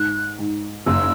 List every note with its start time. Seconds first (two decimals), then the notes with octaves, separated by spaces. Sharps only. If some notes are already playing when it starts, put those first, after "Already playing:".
Already playing: G#2 F#6
0.39 G#2
0.86 F#1 E6